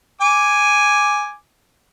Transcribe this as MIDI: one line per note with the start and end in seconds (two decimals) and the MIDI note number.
0.21 1.35 80
0.21 1.35 86